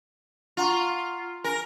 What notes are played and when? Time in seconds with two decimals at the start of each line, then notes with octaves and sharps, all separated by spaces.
0.57 F4 F#5 A#5 C#6
1.44 A#4 G#5